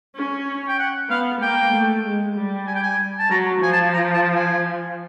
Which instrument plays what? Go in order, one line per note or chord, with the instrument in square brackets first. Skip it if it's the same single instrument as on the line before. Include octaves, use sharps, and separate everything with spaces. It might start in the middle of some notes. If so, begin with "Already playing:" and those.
[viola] C#4
[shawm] G5
F#5
[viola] B3 [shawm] F5
[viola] A#3 [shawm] G5
[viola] A3
G#3
G3
[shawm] G#5
G5
G#5
A5
[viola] F#3 [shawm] A#5
[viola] F3 [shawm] G#5
[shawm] A5
A#5
A5
G#5